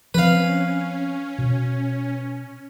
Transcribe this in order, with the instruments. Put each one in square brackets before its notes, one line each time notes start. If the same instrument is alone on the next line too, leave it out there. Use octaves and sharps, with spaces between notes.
[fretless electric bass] F3 C4 [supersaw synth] C#4 [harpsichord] B4 F5
[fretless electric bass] B2